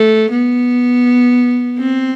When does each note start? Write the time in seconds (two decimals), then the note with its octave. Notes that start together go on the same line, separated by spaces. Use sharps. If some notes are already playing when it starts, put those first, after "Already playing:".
Already playing: A3
0.31 B3
1.78 C4